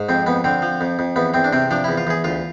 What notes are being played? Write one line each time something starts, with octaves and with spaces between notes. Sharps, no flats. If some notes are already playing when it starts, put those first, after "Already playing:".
Already playing: G#2
F2 C4
F2 B3
D3 C4
F3
F2
F2
E2 B3
E2 C4
D4
C3 C4
F3 D4
E2 E4
F4
E2 G#4
D2 F4